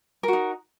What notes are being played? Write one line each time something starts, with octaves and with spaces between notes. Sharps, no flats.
D#4 F#4 A#4